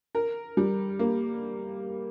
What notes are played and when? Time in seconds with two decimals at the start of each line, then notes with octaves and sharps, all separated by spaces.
0.15 A#4
0.57 G3
0.99 A#3